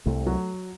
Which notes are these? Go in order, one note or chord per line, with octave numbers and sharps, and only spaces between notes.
C2 C3 A3
F#3